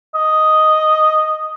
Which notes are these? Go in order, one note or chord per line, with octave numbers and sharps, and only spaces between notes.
D#5